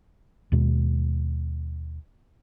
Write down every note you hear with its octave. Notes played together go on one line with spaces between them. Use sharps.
D#2 B2 G#3